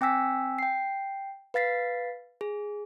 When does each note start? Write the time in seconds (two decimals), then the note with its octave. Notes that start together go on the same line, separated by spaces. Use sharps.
0.01 C4 G5 G#5 E6 B6
0.59 G5 C7
1.54 B4 F5 A6 B6 C7
2.41 G#4